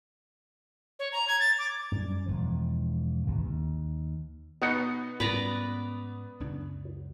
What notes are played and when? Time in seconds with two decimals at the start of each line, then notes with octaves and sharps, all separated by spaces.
0.99 C#5
1.12 A#5
1.28 G#6
1.40 A6
1.59 D6
1.92 F#2 G3
2.26 E1 B1 F3
3.26 G#1 D2 C3 E3
3.45 D#2
4.62 B2 B3 D#4 F#5
5.20 G#2 G3 C#4 B4 D5 A#5
6.40 C#2 F#2 D4